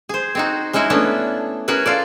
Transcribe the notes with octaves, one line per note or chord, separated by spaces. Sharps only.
G#4 C5
C4 D#4 F#4
G#3 C#4 D#4 E4 F#4
A3 B3 C#4 D4
C#4 F#4 G#4 A#4 B4
F4 A4 D5